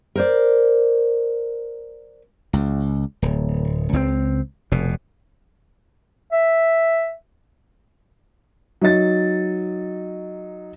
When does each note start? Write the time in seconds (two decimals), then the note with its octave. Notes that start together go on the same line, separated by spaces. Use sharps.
0.15 A#4 C5 D5
2.53 C#2
3.22 D1
3.93 C#2 B3 C4
4.72 F1 B2
6.32 E5
8.81 F#3 D#4 A6